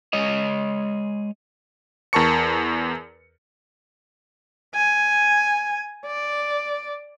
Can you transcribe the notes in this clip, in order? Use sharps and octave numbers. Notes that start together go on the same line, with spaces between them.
G#3 C#5 D#5
E2 A#4 A5 C#6 C#7
G#5
D5